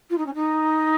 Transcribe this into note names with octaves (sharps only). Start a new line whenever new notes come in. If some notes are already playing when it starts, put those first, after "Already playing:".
F4
D#4
C#4
D#4